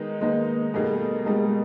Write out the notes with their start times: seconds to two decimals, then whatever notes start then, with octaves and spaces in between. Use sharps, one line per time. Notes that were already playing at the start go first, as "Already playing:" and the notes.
Already playing: D#3 G#3 B3 D#4
0.21 D#3 G#3 A#3 B3 D#4
0.73 B2 G3 A3 A#3 D#4 G#4
1.25 B2 G3 G#3 A#3 D#4 G#4